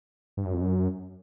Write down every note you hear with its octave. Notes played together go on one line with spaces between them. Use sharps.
G2
F#2
F2
F#2